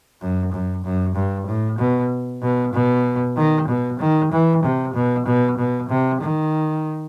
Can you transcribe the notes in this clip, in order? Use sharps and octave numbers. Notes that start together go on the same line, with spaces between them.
F#2
F#2
F#2
G2
A2
B2
B2
B2
D#3
B2
D#3
E3
C3
B2
B2
B2
C3
D#3